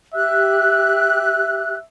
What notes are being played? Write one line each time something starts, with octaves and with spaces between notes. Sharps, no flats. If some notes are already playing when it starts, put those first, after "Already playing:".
G4 E5 F#6